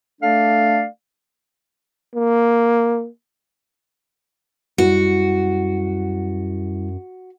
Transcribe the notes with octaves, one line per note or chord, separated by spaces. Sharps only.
A3 D4 A4 D5 F5
A#3
F#2 G3 E4 F#4